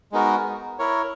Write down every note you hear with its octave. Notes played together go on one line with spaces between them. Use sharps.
G#3 B3 D#4 F#4 A#4
E4 A#4 C#5